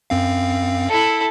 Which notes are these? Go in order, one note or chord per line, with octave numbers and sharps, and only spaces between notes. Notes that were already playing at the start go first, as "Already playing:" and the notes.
F#2 C4 F5
E4 A4